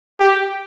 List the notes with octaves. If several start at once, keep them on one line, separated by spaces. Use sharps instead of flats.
G4